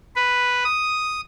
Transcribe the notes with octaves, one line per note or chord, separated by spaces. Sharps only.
B4
D#6